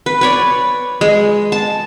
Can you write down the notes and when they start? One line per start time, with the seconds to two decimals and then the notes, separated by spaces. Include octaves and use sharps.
0.06 B4
0.21 B4 C#5 D5
1.01 G#3
1.52 A5